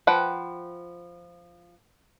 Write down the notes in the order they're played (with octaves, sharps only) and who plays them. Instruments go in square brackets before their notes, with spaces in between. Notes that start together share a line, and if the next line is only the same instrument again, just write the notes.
[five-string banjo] F3 B4 F#5 G5